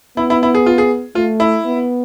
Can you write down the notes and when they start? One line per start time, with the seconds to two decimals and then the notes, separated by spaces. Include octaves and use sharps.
0.17 B3 E4
0.30 E4
0.43 E4
0.54 G#4
0.66 F4
0.78 G#4
1.15 A3 F4
1.40 E4
1.65 B3